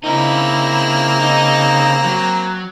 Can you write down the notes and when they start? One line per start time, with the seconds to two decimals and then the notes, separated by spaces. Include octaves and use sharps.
0.04 C#3 A#3 C4 D#4 E4 A#5
1.20 D#4
2.05 F#3